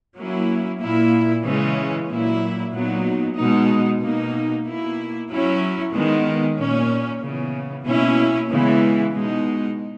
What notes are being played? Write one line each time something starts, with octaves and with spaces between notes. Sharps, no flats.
F#3 A#3 C#4 E4
A#2 A#3 E4
C#3 E3 G#3 C#4
A#2 F#3 A#3 E4
A#2 F#3 B3 D#4
B2 G#3 B3 D#4
B2 A#3 D#4
B2 A#3 E4
F#3 C#4 E4
D#3 G#3 B3
A#2 A#3 C#4
C#3 E3 B3
B2 A#3 C#4 E4
C#3 E3 G#3 B3 E4
B2 G#3 B3 D#4